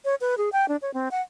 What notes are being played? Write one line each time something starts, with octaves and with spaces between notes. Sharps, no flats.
C#5
B4
G#4
G5
D4
C#5
C4
F#5